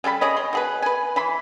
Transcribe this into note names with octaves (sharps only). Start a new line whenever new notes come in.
C#3 G3 A4 B5
C#3 G#4 C#5 D#5
C6
B2 G#4 B4
B4 G#5
E3 B5 C6